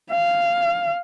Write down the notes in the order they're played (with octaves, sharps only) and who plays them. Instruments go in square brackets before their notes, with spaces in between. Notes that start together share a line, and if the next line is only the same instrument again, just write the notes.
[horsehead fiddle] F5